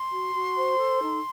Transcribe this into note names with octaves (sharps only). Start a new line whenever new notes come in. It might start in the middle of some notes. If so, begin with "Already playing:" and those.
Already playing: C6
F#4
F#4
C5
A4
D#4